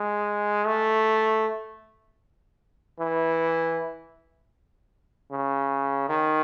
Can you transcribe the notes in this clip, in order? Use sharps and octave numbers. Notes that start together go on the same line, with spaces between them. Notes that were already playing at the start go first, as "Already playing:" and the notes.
Already playing: G#3
A3
E3
C#3
D#3